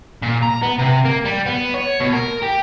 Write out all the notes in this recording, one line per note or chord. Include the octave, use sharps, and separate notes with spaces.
A#2
A#5
B3
C3
A#3
G3
B3
C#5
B2
A#4
G4